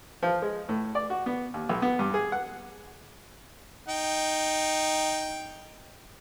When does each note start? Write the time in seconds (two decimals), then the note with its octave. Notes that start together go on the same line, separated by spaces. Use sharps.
0.22 F3
0.42 G#3
0.69 A2
0.95 D5
1.10 F#4
1.26 B3
1.54 D#2
1.69 B1
1.82 B3
1.99 G2
2.14 G#4
2.32 F#5
3.88 D#4 G5